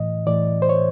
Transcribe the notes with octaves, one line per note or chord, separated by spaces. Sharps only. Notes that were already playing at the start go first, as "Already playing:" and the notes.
Already playing: A2 E3 D#5
A2 E3 D5
C5
C#5